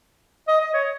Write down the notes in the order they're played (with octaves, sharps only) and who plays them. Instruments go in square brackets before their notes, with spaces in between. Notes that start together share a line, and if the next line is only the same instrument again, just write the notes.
[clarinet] D#5
D#5
C#5